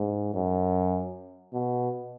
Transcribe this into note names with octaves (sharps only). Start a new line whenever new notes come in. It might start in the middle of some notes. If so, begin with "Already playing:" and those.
Already playing: G#2
F#2
B2